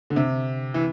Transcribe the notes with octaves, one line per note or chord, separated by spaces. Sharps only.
D3
C3
E3